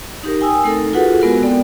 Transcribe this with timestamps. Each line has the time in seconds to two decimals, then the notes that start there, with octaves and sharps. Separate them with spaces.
0.23 D#4 G4 A#4
0.41 G5 G#5 D#6 E6
0.64 A3 C4 D#4 A4 A#4
0.93 F4 F#4 G#4 A4 B4 F#5
1.22 G#3 B3 E4 F#4 A#4
1.43 B3 C4 A4 D5 G5